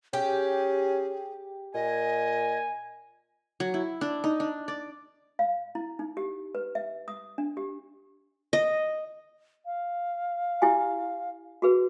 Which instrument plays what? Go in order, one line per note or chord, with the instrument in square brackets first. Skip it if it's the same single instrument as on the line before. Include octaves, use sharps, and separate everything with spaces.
[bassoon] C#4 [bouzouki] G4 [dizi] G#4
[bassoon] A#2 [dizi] D#5 [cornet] G#5
[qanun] F#3
E4
D4
D#4
D4
D5
[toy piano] F5
E4
D#4
G4
B4
E5
D#6
D4
G4
[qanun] D#5
[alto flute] F5
[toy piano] E4 G4 G#5
F#4 G#4 B4